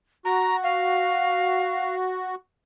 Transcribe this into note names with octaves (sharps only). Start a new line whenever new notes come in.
F#4 A#5
F5